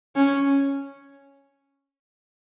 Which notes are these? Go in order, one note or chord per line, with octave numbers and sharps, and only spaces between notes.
C#4